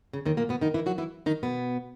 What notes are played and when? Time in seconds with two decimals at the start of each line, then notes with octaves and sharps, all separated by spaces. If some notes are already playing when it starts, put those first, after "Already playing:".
0.13 C#3
0.25 D#2 D#3
0.37 A#2 A#3
0.49 B2 B3
0.61 D#3 D#4
0.74 E3 E4
0.86 F#3 F#4
0.98 E3 E4
1.26 D#3 D#4
1.43 B2 B3